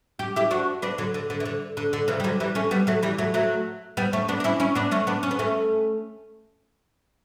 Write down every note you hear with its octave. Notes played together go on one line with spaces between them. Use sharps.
G4
E4 G4
D4 F#4
B3 D4
D3 F#3
D3
D3
E3
D3
D3
D3
C#3 E3
G3
D3 F#3
E3 G3
A3 C#4
G3 B3
F#3 A3
E3 G3
F#3 A3
F#3 A3
G3 B3
A3 C#4
B3 D4
D4
C#4 E4
C#4 E4
B3 D4
A3 C#4
B3 D4
C#4
B3
A3 C#4